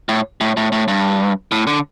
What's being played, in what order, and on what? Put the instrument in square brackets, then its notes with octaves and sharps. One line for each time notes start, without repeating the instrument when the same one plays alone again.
[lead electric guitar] A2
A2
A2
A2
G2
A2
D3